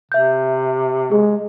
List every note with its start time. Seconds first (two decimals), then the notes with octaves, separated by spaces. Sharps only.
0.12 C3 E5 G6
1.11 G#3 G#4